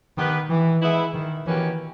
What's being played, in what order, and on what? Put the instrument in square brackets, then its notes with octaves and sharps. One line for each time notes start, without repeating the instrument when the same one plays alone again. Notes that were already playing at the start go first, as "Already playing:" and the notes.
[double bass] D#3 [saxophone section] B3 G4 B4
[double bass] E3
[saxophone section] G#3 B3 E4
[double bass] D#3
[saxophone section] B2 A#3 C#4 G4 B4 [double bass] E3